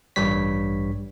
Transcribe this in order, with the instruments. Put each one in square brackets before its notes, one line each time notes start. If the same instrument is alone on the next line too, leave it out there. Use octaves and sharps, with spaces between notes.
[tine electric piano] A1 G2 G3 C#5 B6